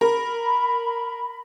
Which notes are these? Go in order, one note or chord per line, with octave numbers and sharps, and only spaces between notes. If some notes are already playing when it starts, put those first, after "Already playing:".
A#4 B5